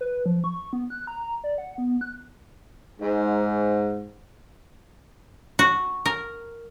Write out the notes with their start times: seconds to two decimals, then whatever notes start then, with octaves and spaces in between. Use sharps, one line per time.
0.01 B4
0.26 F3
0.44 C#6
0.73 B3
0.90 F#6
1.07 A#5
1.44 D5
1.58 F#5
1.78 B3
2.01 F#6
3.01 G#2
5.59 F#4
6.06 A#4